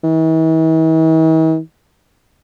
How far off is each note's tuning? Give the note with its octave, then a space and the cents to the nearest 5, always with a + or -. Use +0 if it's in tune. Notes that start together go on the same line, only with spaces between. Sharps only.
E3 -45